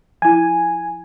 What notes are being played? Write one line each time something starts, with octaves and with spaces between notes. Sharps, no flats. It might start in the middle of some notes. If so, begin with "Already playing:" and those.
F3 E4 G#5